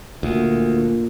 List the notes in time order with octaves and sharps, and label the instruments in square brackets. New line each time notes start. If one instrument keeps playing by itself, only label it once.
[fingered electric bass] D2 [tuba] A#2